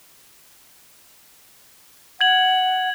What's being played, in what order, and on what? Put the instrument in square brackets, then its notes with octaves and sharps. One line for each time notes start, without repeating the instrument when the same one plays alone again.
[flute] F#5 [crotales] G#6 F#7